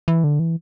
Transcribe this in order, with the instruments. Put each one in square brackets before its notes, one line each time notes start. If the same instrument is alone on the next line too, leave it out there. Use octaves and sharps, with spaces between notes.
[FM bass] E3
D3
E3